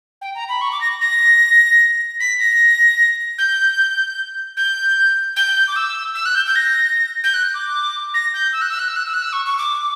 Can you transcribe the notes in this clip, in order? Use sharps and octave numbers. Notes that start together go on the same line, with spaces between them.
G5
A#5
B5
C#6
D6
A#6
A#6
B6
A#6
G6
G6
G6
D6
E6
E6
F#6
G6
G6
A#6
G6
F#6
D6
A#6
G6
E6
F#6
E6
F#6
E6
F#6
E6
F#6
E6
C#6
C#6
D6